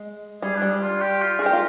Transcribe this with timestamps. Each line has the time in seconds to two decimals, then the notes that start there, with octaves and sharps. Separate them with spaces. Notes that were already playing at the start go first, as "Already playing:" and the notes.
Already playing: G#3
0.42 G3 G#4
0.56 D4
0.62 G3
0.82 F4
1.01 G4
1.22 F4
1.39 G#4
1.41 G4 A#4
1.53 F4